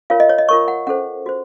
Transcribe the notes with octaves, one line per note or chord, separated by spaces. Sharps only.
F4 A#4 C#5 F5
D#5
C#5
D#5
F4 A#4 C#5 C#6
F#5
C#4 A4 C5 F#5
F#4 C5